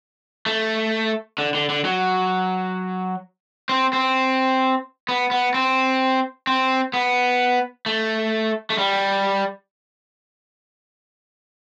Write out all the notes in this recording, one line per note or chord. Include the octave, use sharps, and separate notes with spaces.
A3
D3
D3
D3
F#3
C4
C4
B3
B3
C4
C4
B3
A3
A3
G3